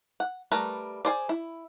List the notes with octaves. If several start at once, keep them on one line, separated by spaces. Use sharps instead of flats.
F#5
G3 A3 A#4 B4
G#4 C5 D5
E4